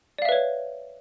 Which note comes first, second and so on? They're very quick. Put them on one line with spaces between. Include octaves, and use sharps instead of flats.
D5 F5 E5 B4 C#5